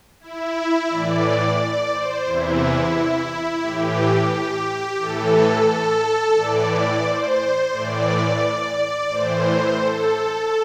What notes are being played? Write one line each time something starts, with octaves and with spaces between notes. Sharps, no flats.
E4
A2 E3 D5
D5
C5
E2 C3 E3 E4
A2 E3 G4
A2 E3 A4
A4
A2 E3 D5
D5
C5
A2 E3 D5
A2 E3 C5
A4